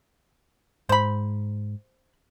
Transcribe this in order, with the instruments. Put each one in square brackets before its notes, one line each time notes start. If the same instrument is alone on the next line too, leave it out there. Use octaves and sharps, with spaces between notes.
[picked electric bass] G#2 [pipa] C5 B5